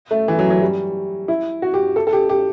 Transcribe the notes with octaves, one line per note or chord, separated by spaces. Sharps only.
A3
E3
F#3
F#3
G3
E4
F#4
G4
A4
A4
G4
G4